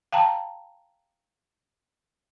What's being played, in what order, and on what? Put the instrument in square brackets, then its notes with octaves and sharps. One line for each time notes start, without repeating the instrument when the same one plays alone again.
[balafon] F5 G5 A5 A#5